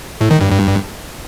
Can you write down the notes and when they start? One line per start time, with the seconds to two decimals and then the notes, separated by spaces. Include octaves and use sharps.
0.21 A2
0.31 D#3
0.41 G2
0.51 G2